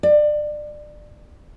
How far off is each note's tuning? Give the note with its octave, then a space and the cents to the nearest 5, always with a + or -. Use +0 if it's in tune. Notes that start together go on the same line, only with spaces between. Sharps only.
D5 +25